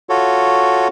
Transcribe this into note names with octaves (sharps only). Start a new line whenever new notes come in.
F4 F#4 A4 C#5